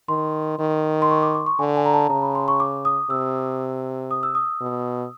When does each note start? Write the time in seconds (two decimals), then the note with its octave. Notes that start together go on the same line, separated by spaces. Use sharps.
0.08 D#3 C6
0.59 D#3
1.02 C6
1.10 C#6
1.23 D6
1.35 D6
1.46 C#6
1.59 D3 G#5
1.77 G#5
1.86 A#5
1.94 A5
2.09 C#3 A#5
2.22 B5
2.35 C6
2.48 C#6
2.60 D6
2.85 D#6
3.10 C3 E6
4.11 D#6
4.23 E6
4.35 D#6
4.61 B2